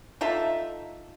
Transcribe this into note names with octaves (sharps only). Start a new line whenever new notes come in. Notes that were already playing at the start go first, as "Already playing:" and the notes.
D#4 F4 A4 E5